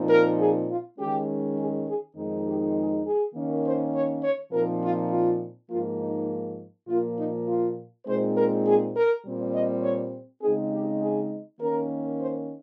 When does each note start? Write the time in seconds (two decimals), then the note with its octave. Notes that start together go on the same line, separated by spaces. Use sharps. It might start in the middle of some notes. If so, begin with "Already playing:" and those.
Already playing: A#2 F3 C4 D#4
0.10 A#4
0.39 G#4
0.69 F4
0.98 D#3 G#3 C#4 G4
1.57 G#4
1.86 G#4
2.16 F2 D#3 G#3 C4 D#4
2.45 G4
2.75 G#4
3.05 G#4
3.34 D#3 A#3 C#4
3.64 C5
3.93 C#5
4.23 C#5
4.52 A#2 F3 C4 D#4 A#4
4.82 F4
5.11 F4
5.70 G#2 F3 A#3 F4
5.99 D#4
6.88 A#2 F3 A#3 F4
7.17 D#4
7.47 F4
8.06 A#2 G#3 C4 D#4 C5
8.35 A#4
8.65 G#4
8.94 A#4
9.23 A#2 G3 C4
9.53 D#5
9.83 C#5
10.42 C#3 G#3 C4 D#4 G#4
10.71 G4
11.01 G#4
11.60 D#3 A#3 C#4 A#4
12.19 C5